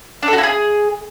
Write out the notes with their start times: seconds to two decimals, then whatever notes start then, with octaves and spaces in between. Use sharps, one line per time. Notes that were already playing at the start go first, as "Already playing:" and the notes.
0.23 D4
0.28 A4
0.33 F#4
0.38 E4
0.43 G#4